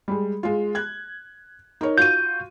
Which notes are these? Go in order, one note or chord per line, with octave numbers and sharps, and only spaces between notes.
G3 G#3
G#3 F4
F#6 G#6
D#4 A#4 C#5
F4 F#4 G6 D#7